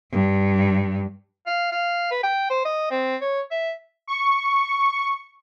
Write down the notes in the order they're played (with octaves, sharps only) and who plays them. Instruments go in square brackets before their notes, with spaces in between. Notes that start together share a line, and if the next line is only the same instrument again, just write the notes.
[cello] G2
[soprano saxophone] F5
F5
B4
G5
C5
D#5
C4
C#5
E5
[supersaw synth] C#6